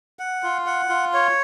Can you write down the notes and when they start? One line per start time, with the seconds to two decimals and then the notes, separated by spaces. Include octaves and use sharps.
0.19 F#5
0.43 F4
0.66 F#5
0.89 F4
1.14 C#5